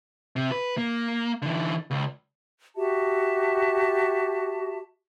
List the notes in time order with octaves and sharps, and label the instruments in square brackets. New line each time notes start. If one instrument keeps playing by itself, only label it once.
[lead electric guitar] C3
B4
A#3
D3 E3
C#2
[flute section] F#4 G4 E5 A5